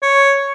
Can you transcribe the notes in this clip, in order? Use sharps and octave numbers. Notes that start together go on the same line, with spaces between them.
C#5